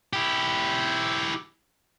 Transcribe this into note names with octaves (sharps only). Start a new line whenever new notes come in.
E4 G4